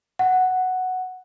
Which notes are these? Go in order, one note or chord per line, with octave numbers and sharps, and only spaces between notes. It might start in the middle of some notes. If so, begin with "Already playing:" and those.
F#5